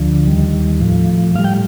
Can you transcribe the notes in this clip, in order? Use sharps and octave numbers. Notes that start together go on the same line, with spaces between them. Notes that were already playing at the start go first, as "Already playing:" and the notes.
Already playing: D2 D3 F3
D#2 D#3 G3
A2 F3
A2 G3 F5
G5